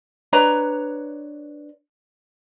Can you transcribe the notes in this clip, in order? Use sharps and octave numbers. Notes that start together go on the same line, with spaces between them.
D4 B4 C#5 A#5